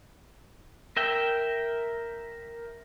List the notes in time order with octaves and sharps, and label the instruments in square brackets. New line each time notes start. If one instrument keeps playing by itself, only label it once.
[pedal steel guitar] A#4 E5 G5